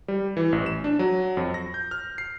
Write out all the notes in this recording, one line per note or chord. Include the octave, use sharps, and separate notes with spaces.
G3
E3
A1
E7
D4
F#3
F2
A#6
G6
F6
C7